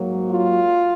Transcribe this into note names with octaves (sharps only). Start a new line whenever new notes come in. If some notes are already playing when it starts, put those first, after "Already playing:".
Already playing: G#2 F#3 A#3
F4